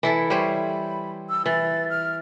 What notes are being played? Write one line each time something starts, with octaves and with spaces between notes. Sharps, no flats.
E3 E4 A4
G3 C5 C#5 B5
E6
E3 A6
F6